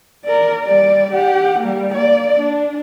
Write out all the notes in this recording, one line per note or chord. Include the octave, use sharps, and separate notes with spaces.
A#4 D5
G3 D5
G4 F#5
G3 A#3
A#3 D5
D4